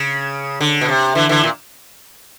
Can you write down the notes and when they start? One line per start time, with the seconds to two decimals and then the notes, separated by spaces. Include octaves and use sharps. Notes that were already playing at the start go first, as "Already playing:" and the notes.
Already playing: C#3
0.61 D3
0.81 B2
0.89 C3
1.15 D3 E3
1.29 D3 E3
1.44 A#2